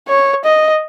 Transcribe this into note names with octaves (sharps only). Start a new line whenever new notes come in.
C#5
D#5